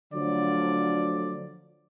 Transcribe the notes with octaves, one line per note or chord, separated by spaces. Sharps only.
D3 F3 F#3 A3 D5